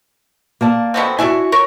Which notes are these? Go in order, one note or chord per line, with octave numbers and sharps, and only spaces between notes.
A#3 D5 A5
B2 D3 C4
D4 E4 F#4 E5 G#5
A#4 C#5